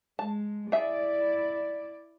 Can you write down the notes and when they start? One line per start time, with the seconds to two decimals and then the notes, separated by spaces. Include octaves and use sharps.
0.19 G#3 A5
0.72 E4 G#4 D5 E5